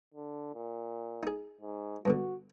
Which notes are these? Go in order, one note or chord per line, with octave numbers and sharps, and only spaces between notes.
D3
A#2
D#4 G#4
G#2
G2 B2 D3 F#4